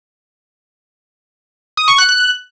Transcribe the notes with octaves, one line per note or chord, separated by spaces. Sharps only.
D#6
C#6
F#6
F#6